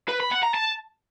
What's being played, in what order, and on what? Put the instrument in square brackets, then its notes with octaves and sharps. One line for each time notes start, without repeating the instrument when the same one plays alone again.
[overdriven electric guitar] B4
B5
F#5
A#5
A5